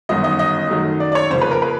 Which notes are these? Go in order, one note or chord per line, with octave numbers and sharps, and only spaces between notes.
G1 F#2 D#3 F#3 B3 D#5
D#5
D#5
F#2 D#3 F#3 A3
D5
D5
C#5
F2 C#3 F3 A#3 C5
B4
A#4
B4